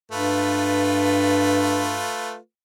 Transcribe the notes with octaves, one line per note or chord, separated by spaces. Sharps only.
G2 A3 F4 B4